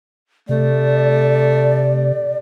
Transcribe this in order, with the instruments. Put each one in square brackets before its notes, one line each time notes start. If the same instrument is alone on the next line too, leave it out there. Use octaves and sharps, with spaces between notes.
[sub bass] C3 [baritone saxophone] A3 [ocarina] D5